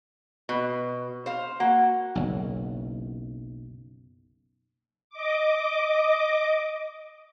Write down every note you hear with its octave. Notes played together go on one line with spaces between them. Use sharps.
B2
C5 F5
A#3 F#4
F#1 B1
D#5 D6